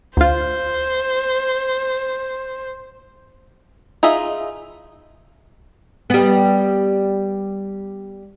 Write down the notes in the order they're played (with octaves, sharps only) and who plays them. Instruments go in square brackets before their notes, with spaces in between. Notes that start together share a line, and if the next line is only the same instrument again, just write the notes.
[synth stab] D2 F4 [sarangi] C5
[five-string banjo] D#4 F4 G#4 D#5 E5
[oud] G3 B3